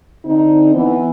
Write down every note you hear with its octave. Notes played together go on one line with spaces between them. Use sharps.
D3 C4 D#4
E3 B3